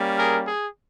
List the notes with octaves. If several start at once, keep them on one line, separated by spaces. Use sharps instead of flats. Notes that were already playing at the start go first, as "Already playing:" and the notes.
Already playing: G3 A#3 C#4
G#4 A#4
G#4